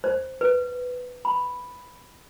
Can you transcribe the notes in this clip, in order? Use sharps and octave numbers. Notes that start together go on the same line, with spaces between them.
C5
B4
B5